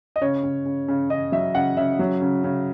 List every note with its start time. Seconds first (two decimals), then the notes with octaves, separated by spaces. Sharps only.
0.16 D#5
0.22 C#3 C#5
0.43 C#3
0.66 C#3
0.88 C#3
1.10 C#3 D#5
1.32 F#3 E5
1.55 C#3 F#5
1.77 C#3 E5
1.99 F#3
2.22 C#3
2.44 C#3